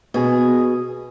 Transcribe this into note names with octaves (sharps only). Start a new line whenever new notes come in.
B2 G#4